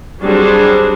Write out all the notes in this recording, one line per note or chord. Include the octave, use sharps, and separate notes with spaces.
F#3 G3 C4 D4 G#4 C5